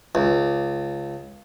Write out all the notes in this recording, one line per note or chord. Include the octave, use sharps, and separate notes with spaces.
C#2